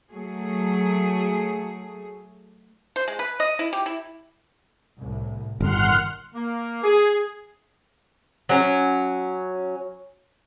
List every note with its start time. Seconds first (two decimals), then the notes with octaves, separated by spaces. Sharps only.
0.13 F#3 A3 G#4
2.96 C5
3.08 G#3
3.19 B4
3.40 D#5
3.59 E4
3.73 G4
3.86 E4
4.99 C2 A2
5.61 G1 A2 D#3 F#5 C6 F6
6.35 A#3
6.83 G#4
8.49 F#3 C#4